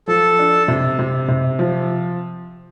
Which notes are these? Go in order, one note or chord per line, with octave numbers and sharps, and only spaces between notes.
F3 A4
D4
C3
C3
C3
F3